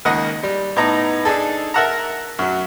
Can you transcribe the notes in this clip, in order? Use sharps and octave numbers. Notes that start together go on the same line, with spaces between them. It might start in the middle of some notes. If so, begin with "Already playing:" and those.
C#2 D#3 A#3 D#5 F#5
G3
A2 B3 D#4 A#5
D4 D#4 G#4 A4
A#4 E5 F#5 A5 A#5
F#2 F#3